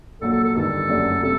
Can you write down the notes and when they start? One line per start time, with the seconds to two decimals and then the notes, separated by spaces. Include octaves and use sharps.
0.21 A#1 A#2 F#3 A4
0.33 A4
0.44 A4
0.55 G1 G2 D#3 G3 A4
0.89 F#1 F#2 F#3 A3 D4
1.23 C3 G3 A4